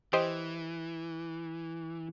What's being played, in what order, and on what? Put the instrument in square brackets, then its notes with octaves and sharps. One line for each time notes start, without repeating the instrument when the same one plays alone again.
[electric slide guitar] E3 [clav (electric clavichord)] G4 C5 D#5